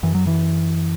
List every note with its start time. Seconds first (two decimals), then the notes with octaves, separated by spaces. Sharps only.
0.03 F#2 E3
0.15 F#3
0.27 E3